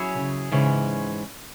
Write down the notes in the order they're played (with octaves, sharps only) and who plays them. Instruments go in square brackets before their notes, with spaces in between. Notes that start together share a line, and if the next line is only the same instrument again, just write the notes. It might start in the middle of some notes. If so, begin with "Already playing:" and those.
Already playing: [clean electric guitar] F#3 C#4 E4 G#4 C#5
[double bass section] C#3
[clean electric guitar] G#2 E3 C#4 [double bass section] C#3